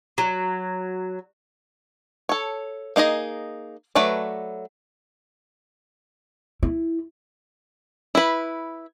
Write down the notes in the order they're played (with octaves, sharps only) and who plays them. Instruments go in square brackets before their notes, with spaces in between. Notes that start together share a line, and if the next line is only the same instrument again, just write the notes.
[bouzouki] F#3
[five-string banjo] A4 C#5
A#3 D#4 G#4 D#5
F#3 A3 B4 D5
[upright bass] E4
[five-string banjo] E4 B4